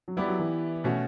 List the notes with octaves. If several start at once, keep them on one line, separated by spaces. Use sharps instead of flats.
F#3
G3 B3 E4 G4 B4 D5
F#3
E3
B2 A3 C#4 F#4